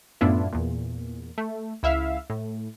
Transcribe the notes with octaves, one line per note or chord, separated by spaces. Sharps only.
F#2 A2 B3 D4 E4 F4
E2 A#2
A3
C#2 E4 E5 F5
A2